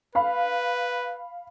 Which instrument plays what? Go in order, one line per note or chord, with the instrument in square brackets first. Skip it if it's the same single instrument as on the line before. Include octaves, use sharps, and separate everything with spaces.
[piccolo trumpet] B4 [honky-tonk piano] F5 B5